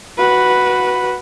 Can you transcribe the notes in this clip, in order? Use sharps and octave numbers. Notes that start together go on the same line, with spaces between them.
F#4 B4